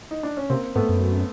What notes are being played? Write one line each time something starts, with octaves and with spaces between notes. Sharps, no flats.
D#4
D4
C#4
C3 A#3 C4
G#2 A3 B3
F#2